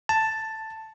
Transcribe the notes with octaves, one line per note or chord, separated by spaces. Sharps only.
A5